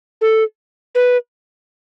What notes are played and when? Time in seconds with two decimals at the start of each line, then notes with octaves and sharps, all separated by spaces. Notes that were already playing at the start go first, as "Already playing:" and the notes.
0.21 A4
0.95 B4